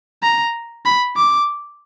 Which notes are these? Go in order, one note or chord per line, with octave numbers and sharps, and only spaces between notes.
A#5
B5
D6